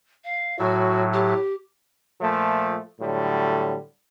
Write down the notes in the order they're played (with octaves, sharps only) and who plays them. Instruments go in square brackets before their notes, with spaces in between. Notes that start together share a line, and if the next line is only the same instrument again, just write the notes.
[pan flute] F5
[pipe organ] A2 F#3 [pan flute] F#4
[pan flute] G4
[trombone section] A#2 F3 A3
A2 D3 F#3 G3